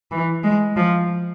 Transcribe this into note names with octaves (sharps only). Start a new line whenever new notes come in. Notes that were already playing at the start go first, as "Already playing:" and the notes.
E3
G#3
F3